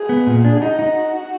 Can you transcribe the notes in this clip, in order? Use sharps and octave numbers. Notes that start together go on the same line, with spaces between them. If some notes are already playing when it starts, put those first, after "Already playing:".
Already playing: G#4
B3
A#2
D4
D#4 F#4
D#4